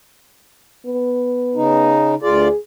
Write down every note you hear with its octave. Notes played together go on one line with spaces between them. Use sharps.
B3
C#3 D#4
D2 F4 G#4 D5